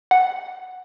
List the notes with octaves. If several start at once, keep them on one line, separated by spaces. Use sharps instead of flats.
F#5